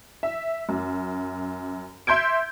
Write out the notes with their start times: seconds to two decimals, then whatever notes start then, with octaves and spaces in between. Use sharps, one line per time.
0.23 E5
0.69 F#2
2.07 E5 C6 G6 G#6 D7